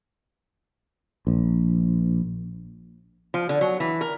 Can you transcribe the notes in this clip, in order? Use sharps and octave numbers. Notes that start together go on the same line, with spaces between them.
A#1
F3
D3
F#3
E3
A#4